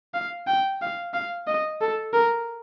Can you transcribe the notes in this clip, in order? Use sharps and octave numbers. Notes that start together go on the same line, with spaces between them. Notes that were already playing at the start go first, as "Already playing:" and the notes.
F5
G5
F5
F5
D#5
A4
A#4